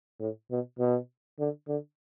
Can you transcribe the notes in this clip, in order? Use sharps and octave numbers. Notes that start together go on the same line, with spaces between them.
A2
B2
B2
D3
D3